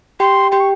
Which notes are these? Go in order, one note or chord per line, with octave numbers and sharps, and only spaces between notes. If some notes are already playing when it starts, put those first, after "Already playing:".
G4 G5 C6
G4 G5 C6
C#6